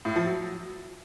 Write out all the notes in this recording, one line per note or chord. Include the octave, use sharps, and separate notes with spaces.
A2
F3
F#3